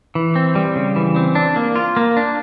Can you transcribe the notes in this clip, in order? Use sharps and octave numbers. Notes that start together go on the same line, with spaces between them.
E3
C4
G3
C#3
E3
C4
D4
A#3
F4
A#3
D4